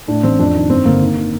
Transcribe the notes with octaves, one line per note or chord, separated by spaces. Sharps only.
A2 D4
A1 C4
F2 D4
D#3
G2 C4
G1 A#3
D#3
D#3